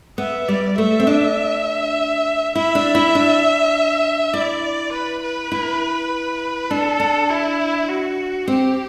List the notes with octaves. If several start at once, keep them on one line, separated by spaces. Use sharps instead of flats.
B3 E5
G3 D5
A3 E5
C4
D4
E4 E5
D4
E4
D4
E4 D5
B4
B4
E4
D4 A4
D4
E4
F#4
C4 G4